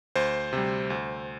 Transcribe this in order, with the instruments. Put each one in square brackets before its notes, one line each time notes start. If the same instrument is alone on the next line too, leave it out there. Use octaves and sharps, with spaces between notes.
[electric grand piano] D2 C5
C3 G3
D2